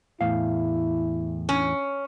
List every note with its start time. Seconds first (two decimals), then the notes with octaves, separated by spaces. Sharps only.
0.21 E2 A2 E4 F5
1.49 C#4